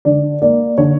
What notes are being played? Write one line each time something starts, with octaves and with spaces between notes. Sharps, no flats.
D3 D5
A#3 D5
D3 C#5